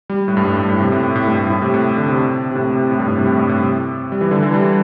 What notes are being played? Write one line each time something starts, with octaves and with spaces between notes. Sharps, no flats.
G3
A2
G2
A2
G2
A2
C3
A2
A2
A2
G2
A2
A2
C3
A2
D3
C3
C3
A2
C3
A2
G2
A2
C3
A2
G2
A2
C3
G3
E3
D3
E3
G3